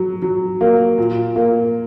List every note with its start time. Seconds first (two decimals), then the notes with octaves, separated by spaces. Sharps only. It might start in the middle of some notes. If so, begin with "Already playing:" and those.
Already playing: F#3
0.22 F#3
0.61 A#3
0.98 A#2
1.36 A#3